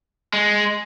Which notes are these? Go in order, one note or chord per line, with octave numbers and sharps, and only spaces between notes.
G#3